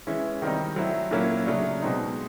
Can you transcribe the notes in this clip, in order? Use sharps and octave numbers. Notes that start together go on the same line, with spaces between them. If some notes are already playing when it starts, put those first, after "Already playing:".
E3 G#3 C#4 E4
D#3 G3 C4 D#4
F#3 A3 C4 E4
A#2 F#3 A#3 C#4 E4
C#3 F#3 A3 D4
B2 G#3 C4 D#4